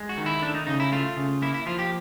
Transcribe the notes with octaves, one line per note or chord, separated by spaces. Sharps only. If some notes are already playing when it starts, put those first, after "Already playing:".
Already playing: G#3
F#4
D#3
E4
A3 D4
D#4
C#3 D#4
E4
A3 F4
C#3
A#3 E4
E4
F3 F4
G4